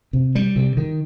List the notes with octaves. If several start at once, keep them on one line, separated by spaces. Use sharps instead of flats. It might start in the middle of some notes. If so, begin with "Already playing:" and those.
C3
G3
C3
D#3